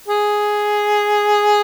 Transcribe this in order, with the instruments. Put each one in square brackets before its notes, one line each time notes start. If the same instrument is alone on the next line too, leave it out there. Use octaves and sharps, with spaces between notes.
[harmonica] G#4